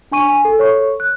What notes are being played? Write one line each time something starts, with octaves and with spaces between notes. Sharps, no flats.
D4 G#5 C#6 D#7
G#5
A4
A4 C#5 C#6
F#6